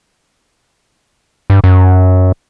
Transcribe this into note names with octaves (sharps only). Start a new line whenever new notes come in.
G2
F#2